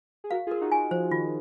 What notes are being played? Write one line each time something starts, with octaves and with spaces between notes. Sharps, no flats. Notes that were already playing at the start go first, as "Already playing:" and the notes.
G#4
F#4 A#4 F5
F4 G#4
A#4
D#4 F#4
G#5
F3 C5
D#3 F4